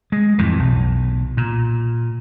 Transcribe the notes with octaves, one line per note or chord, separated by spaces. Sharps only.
G#3
F2 A2 E3
B1
A#2